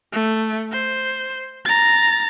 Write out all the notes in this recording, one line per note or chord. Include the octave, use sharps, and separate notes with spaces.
A3
C5
A#5 A6